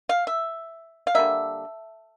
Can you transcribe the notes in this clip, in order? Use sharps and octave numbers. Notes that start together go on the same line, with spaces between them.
F5
E5
F5
D3 G3 A#3 E5